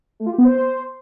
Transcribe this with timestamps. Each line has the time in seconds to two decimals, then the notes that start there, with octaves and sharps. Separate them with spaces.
0.20 A3
0.26 F4
0.32 G4
0.38 B3
0.44 C5